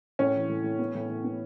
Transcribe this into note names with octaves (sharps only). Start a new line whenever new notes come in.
A2 C#4
E3
A2
A2
B3
A2
A2
B3